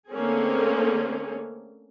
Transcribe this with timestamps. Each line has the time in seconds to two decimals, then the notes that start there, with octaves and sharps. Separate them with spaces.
0.10 D3 A3 A#3 C4 C#4 G#4